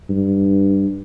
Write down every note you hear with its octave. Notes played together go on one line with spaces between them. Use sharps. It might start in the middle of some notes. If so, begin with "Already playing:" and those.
G2